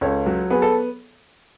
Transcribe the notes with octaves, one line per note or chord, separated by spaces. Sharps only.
C#2 A4 C#5
F#3
B3 G#4
A4